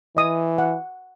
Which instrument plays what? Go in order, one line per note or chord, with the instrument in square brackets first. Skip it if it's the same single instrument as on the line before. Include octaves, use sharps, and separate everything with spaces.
[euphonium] E3 [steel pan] D#5 D#6
[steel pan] F#5